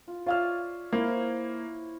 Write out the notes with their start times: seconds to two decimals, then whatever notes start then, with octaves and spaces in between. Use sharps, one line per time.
0.08 F4
0.26 F4 C#5 D5 E5 F5 F6
0.93 A#3 E4 C5 C#5